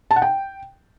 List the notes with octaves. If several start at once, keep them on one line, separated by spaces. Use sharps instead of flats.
A5
F#5
G5